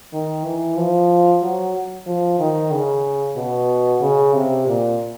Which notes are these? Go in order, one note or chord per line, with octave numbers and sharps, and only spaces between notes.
D#3
E3
F3
F#3
F3
D#3
C#3
B2
C#3
C3
A#2